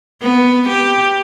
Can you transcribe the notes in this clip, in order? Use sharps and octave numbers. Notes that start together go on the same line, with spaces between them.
B3
G4